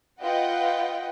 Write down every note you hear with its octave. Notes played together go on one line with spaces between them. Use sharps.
F4 B4 D#5 F#5 G5